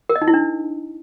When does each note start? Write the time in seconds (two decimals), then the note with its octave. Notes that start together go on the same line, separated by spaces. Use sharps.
0.09 A#4
0.16 D#5
0.22 D#4
0.28 E4
0.34 D4